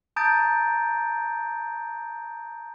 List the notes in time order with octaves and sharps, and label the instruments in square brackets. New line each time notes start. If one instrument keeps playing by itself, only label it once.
[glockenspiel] A5 A#5 D#6 G6 A6 D7